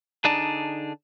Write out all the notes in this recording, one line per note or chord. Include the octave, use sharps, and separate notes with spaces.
D3 D4 D#4 G#4 D5 A5